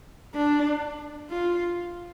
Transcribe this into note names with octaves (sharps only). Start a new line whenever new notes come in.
D4
F4